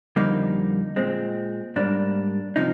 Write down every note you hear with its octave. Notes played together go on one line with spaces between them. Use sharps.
F2 D3 G3 A#3 D#4
A#2 G#3 C4
G#2 G3 A#3 D4
C3 F3 D#4